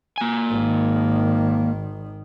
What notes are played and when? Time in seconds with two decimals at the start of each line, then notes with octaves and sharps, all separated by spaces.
0.18 A#3 G#5
0.51 G#1 D#3